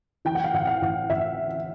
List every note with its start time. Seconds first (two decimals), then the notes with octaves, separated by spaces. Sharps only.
0.25 E3 G5
0.35 F#5
0.44 F5
0.54 A1 F#5
0.67 F5
0.82 A1
1.10 A1 E5